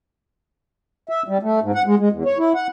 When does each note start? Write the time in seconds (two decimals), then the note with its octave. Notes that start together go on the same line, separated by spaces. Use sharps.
1.09 E5
1.28 G3
1.43 A3
1.62 G#2
1.75 F#5
1.86 G#3
1.99 G#3
2.12 E2
2.25 C#5
2.38 E4
2.55 F#5